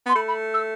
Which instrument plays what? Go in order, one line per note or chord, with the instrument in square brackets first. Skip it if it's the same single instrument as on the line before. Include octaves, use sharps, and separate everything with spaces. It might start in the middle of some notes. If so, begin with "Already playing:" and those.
[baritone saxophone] B3 [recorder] C6
[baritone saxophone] A3 [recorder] B5
[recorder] B5
E6